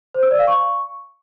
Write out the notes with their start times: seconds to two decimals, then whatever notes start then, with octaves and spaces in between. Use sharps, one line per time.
0.14 C5
0.23 E6
0.31 D5
0.39 F5
0.47 C#6